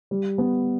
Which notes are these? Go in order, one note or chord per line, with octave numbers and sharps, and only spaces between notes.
G3
B3